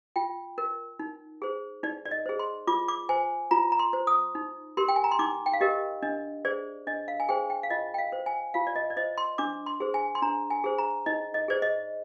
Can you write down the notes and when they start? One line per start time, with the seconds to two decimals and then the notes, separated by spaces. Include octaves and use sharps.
0.16 F4 G5
0.58 A#4
0.99 D#4
1.42 G#4 C5
1.83 D#4 D5
2.05 D5
2.11 D#5
2.26 G#4 C5
2.39 C6
2.67 F4 D6
2.88 D6
3.09 C5 G#5
3.51 F4 A#5
3.72 A#5
3.79 C6
3.93 C5
4.07 D#6
4.35 D#4
4.77 G4 A#4 C6
4.88 G5
4.96 G#5
5.04 A#5
5.12 C6
5.19 D#4 D6
5.46 G5
5.53 F5
5.61 G4 A#4 D#5
6.03 D4 D#5
6.45 G#4 C5 D5
6.87 D4 D#5
7.08 F5
7.20 G#5
7.29 G#4 C5 G5
7.50 G5
7.63 F5
7.70 F4 D#5
7.94 G5
7.98 F5
8.12 C5
8.26 G#5
8.54 F4 F5
8.67 D5
8.76 D#5
8.90 D5
8.97 C5 D#5
9.18 C6
9.38 D4 D6
9.66 C6
9.80 G#4 C5
9.94 G#5
10.15 C6
10.22 D4 A#5
10.50 G#5
10.64 G#4 C5
10.78 A#5
11.06 D#4 D#5
11.34 D#5
11.48 G#4 C5 D5
11.62 D#5